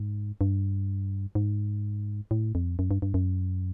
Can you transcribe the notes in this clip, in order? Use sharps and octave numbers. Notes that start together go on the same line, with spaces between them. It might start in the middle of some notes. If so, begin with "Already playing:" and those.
Already playing: G#2
G2
G#2
A2
F2
F#2
G2
G2
F#2